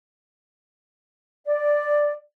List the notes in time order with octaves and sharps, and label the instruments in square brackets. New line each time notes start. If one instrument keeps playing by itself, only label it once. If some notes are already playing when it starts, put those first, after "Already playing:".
[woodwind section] D5